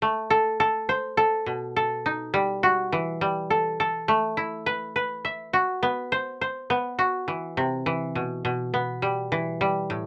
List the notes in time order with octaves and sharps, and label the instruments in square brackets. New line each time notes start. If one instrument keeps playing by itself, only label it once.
[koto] A3
A4
A4
C5
A4
B2
A4
D#4
G3
F#4
E3
G3
A4
A4
A3
E4
B4
B4
E5
F#4
B3
C5
C5
B3
F#4
E3
C3
E3
B2
B2
B3
G3
E3
G3
A2